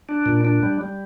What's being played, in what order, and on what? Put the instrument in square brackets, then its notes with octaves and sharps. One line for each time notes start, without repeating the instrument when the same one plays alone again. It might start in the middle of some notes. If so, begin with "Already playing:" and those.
[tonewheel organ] D4
A#2
D4
G3
G3